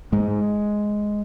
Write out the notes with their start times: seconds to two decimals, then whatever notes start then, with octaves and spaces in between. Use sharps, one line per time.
0.12 G#2 G#3
0.28 G#2